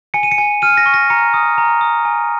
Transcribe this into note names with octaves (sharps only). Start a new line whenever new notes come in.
G#5 C#7
D#7
C#7
G#5
F6 D#7
A#6
C#6
A#6
A#5 C#7
D#6
A#5
D#6
G#5